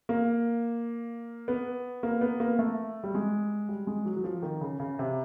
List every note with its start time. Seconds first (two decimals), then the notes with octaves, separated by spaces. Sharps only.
0.09 A#3
1.48 B3
2.03 A#3
2.21 B3
2.40 A#3
2.59 A3
3.04 G3
3.15 G#3
3.69 G3
3.87 G#3
4.06 F#3
4.16 F#3
4.24 F3
4.42 D#3
4.61 C#3
4.80 C#3
4.99 C3